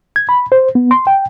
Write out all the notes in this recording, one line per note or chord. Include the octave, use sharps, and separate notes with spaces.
G#6
B5
C5
B3
C6
G5